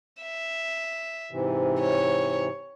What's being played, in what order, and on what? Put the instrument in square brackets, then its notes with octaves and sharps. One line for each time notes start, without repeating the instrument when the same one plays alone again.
[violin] E5
[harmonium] G#2 C3 E3
[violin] C#5